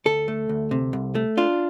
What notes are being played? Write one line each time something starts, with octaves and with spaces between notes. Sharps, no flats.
D2 A4
A3
D2
C3
C2
A3
D4 F4